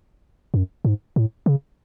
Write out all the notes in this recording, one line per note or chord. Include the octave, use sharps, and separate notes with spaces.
F#2
G#2
A2
C#3